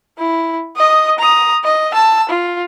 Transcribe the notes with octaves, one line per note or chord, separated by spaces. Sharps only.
E4
D#5 D#6
A#5 D#6
D#5
A5 E6
F4